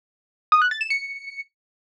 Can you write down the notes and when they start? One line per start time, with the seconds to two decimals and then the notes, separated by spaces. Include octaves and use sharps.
0.52 D#6
0.62 F#6
0.71 A6
0.81 E7
0.90 C#7